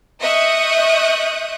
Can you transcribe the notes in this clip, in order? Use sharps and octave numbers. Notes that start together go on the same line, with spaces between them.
D#5 E5 C#6 D#6 F#6 G6